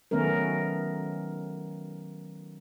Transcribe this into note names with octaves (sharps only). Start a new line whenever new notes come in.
D#3 F#3 A3 B3 C#4 A#4